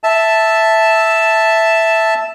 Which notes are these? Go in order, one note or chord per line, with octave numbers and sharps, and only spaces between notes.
E5 A5